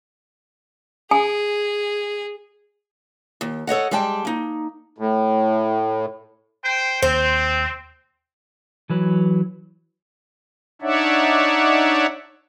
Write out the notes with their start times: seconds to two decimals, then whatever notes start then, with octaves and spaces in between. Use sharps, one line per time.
1.11 G#4 G#5
3.41 D#2
3.67 A4 C#5 D#5 F#5
3.91 G3 G#3 D5 G5 A5
4.25 A#3 D#4
4.98 A2
6.64 C5 G5
7.02 D#2 C4 C5
8.90 E3 F#3 B4
10.82 D4 D#4 C#5 D5 E5 F#5